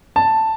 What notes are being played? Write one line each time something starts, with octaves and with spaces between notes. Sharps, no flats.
A5